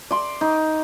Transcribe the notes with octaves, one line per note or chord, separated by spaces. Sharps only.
D5 C6
D#4